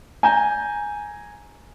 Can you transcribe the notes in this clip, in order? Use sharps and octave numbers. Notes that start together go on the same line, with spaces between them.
G#5 A#5 G6